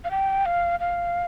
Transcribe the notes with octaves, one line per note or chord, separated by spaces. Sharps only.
F5
G5
F5
F5